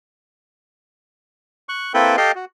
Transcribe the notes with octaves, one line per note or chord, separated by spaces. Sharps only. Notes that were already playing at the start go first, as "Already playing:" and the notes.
C#6 F#6
A#3 C4 E4 A4 B4 G5
G4 A4 D#5 F5 G5
F#4